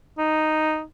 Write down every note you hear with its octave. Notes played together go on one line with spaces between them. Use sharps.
D#4